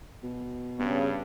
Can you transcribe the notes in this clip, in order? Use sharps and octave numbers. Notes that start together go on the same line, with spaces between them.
B2
G2 C#3 B3